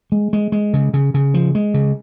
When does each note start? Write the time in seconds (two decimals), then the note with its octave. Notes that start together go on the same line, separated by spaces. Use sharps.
0.12 G#3
0.33 G#3
0.52 G#3
0.74 C#3
0.94 C#3
1.14 C#3
1.34 F3
1.55 G#3
1.74 C#3